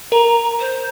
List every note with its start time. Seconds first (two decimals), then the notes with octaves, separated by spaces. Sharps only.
0.12 A#4 A#5
0.60 C5